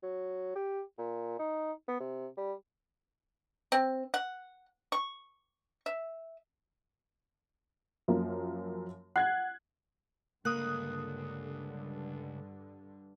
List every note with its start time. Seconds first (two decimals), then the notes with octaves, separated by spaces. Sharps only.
0.03 F#3
0.56 G4
0.98 A#2
1.39 D#4
1.88 B3
2.00 C3
2.37 G3
3.72 C4
4.14 F#5
4.92 C#6
5.86 E5
8.08 F#2 F3 A#3
9.16 F#5 F#6 G#6 C7
10.45 C#2 G2 D3 A#3 D#6 F#6